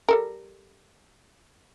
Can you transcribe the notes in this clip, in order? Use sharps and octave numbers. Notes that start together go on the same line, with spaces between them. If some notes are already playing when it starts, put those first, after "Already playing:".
G3 A4 A#4